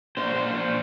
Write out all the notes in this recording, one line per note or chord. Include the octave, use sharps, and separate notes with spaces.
A#2 C5
A#2
A#2